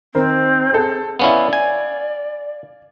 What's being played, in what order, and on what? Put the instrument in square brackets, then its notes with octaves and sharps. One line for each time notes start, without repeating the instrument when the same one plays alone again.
[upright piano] D#3 A#4 C5 [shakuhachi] C4
[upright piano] G#4 A4
[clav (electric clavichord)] B3 C#4 E4 [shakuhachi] D5 [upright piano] F5
[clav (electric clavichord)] G#5